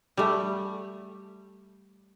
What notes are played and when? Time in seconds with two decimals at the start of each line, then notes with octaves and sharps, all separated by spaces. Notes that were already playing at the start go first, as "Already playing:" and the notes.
0.17 G3 A3